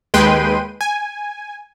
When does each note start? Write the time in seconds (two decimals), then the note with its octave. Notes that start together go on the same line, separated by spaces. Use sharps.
0.14 D#2 G#3 B4 G5 C6 D#7
0.81 G#5